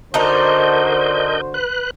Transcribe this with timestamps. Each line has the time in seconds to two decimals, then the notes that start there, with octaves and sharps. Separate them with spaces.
0.14 D3 D4 D#4 F#4 A#4 C5 D#5 G6
1.54 B4 F#6